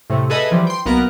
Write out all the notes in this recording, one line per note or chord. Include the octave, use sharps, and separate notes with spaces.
A2 C3 A3
G#4 A4 B4 D#5 E5 G#5
E3 F3 G3
G5 C6
B1 A#3 B3 A#4 F#6